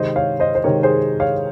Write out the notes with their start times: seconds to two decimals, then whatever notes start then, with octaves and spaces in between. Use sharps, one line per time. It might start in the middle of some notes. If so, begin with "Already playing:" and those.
Already playing: C3 D#3 G#3 C5 D#5
0.16 C#5 F5
0.40 C5 D#5
0.55 C5
0.64 C3 D#3 G#3 A#4 C#5
0.83 G#4 C5
1.20 C#5 F5